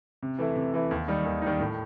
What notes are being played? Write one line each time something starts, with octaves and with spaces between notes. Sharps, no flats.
C3
E3 A3 E4
C3
E3 A3 E4
D#2
D#3 G3 D#4
D#2
D#3 G3 D#4
A2